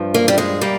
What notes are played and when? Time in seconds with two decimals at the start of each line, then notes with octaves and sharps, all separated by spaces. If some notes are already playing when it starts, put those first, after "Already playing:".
Already playing: G2 F3
0.14 A#3
0.28 G3
0.38 G#3
0.61 G3 A#3